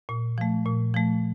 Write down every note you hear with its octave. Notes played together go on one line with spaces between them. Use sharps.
A#2
F3 A3
A#2
F3 A3